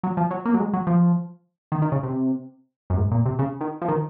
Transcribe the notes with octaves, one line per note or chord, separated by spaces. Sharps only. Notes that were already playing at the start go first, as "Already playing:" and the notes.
F#3
F3
F#3
A#3
F#3
G#3
F#3
F3
D#3
D#3
C#3
C3
F#2
G#2
A#2
C3
C#3
D#3
F3
D#3